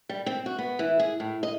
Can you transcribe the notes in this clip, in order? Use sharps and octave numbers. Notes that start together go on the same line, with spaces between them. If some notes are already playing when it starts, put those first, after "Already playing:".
G3
C4
F#4
B3
E3
G#4
A2
D#5